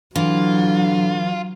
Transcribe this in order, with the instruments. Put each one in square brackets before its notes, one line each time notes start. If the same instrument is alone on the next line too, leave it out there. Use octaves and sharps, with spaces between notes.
[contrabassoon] D3 [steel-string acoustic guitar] E3 [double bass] F#3 [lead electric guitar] F4